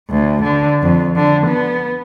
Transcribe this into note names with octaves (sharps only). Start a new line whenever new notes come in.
D2
D3
F2
D3
B3